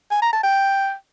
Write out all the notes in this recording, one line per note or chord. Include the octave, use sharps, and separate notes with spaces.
G#5
A#5
A5
G5